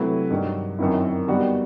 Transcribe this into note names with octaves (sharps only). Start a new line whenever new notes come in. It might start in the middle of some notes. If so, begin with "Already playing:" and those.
Already playing: C3 F#3 A3 E4 B4
G2 D#3 F#3
F#2 D#3 F#3 C4 E4
D#3 G3 B3 F#4